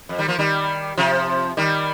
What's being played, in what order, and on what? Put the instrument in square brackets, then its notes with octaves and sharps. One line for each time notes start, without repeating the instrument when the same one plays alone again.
[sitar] F2
D#3 G3
F3 A#3
D#3 G3
C3 F3
D#3 G3